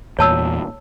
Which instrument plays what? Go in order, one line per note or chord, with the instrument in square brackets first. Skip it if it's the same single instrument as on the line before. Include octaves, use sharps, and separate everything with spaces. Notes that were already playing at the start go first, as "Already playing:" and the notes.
[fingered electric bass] E2 A#2 [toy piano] C#5 A5 E6